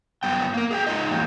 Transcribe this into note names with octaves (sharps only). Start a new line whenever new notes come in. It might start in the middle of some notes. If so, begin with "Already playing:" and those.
F#2 G3 B3 G5
A#3 A#4
G#4 E5 G5
G#3 D#4 F4 D#5
E2 A2 A#3 G4